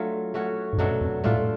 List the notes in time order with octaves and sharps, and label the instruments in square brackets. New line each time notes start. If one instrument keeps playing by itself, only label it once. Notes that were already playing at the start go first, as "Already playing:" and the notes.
Already playing: [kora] F#3 A3 D4 F4
A3 C#4 F#4 C#5
[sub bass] G#2
[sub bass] F#2 [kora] B2 F#3 A3 D4
[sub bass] F2
[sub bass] A2 [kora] A3 D4 F4